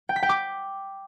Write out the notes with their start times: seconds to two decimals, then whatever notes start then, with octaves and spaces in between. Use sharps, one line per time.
0.09 G5
0.16 B6
0.23 G5
0.29 D6